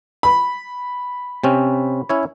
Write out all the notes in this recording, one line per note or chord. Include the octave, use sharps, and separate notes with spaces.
B5
C3 C4 C#4
C#4 E4 C#5